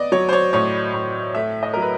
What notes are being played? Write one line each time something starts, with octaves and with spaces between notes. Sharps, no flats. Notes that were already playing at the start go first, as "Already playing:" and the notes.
Already playing: B3 D5 D#5
F#3 C#5
C5
C#5
A2 C#5
A2
A3 E5
D#5
F#3 A#4
B4